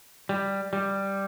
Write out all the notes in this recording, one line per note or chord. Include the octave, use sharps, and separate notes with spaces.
G3
G3